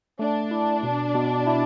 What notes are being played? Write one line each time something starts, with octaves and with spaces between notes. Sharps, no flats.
A3 D4
E4
B2
B2
E4